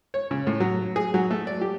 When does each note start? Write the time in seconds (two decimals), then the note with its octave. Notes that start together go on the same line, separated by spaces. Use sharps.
0.14 C#5
0.31 C#3
0.47 A2
0.60 F#3
0.96 G#4
1.14 F#3
1.31 A3
1.47 D5
1.61 G4